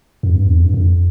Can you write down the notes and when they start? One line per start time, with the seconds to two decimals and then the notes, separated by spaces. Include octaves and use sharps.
0.23 F2
0.35 G2
0.46 E2
0.58 F2
0.65 G2
0.74 F2